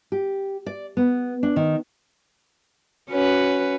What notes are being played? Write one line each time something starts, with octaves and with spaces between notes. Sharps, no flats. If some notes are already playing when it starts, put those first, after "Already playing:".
G4
D5
B3
D4
D#3
C#4 F#4 B4